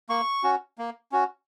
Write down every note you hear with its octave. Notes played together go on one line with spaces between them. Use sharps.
A#3 C#6
C#4 F#4
A#3
C#4 F#4